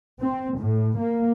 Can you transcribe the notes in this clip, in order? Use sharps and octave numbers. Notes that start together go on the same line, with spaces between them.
C4
A2
A#3